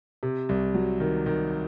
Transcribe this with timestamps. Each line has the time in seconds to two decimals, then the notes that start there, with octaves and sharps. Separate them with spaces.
0.23 C3
0.49 C2
0.74 F#3
1.00 D#3
1.26 D#3